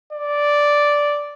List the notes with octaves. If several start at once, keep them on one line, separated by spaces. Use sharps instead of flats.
D5